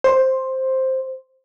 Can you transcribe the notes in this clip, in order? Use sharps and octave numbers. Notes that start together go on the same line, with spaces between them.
C5